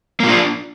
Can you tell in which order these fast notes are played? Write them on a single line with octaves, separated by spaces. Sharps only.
A#3 F4 D4